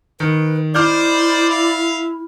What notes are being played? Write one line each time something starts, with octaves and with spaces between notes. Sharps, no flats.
D#3 B4
D#4 E4 C5 D5 D6 F6 G6
E5 F5